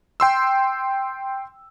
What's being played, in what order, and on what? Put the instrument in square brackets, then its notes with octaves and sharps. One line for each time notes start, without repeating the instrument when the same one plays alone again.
[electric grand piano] G5 C6 E6